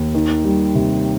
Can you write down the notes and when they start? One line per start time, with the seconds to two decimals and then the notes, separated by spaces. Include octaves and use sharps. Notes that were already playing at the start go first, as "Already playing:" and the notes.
Already playing: D#2
0.14 D#3
0.44 G3
0.75 C3